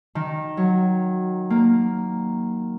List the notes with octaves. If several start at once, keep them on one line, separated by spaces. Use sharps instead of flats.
D#3
F#3
A#3